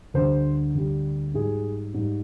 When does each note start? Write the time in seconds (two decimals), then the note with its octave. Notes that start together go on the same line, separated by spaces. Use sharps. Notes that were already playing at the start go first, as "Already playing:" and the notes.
0.14 D2 D3 G3 C5
0.75 D2 D3 G3
1.34 G#2 G3 G#4
1.94 G#2 G3